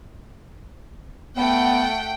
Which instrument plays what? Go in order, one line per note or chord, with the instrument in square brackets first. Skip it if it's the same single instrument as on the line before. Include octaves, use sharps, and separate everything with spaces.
[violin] A3 F#5 [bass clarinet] B3 [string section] G5